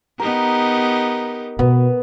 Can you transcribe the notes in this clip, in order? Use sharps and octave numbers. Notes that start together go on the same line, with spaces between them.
B3 D#4 G4 A#4
B2 B3